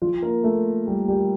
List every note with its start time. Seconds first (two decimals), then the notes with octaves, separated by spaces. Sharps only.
0.02 F3 F4
0.23 A#3 A#4
0.44 A3 A4
0.87 G3 G4
1.08 G3 G4